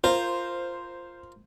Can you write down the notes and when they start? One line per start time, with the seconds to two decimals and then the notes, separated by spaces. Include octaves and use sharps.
0.04 F4 A#4 C5